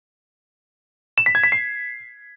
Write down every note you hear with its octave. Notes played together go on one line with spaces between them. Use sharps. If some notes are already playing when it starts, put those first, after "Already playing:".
E7
B6
G#6
B6
C7